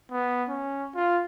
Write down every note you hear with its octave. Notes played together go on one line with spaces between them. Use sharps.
B3
C#4
F4